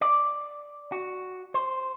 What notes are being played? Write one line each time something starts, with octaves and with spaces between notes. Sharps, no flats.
D5
F#4
C5